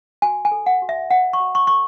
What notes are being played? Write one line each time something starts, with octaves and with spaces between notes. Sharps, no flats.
F#4 G#5
G#5
A4
F#5
F#4
E5
C#5 F#5
C#6
F#4
C#6
A4 C#6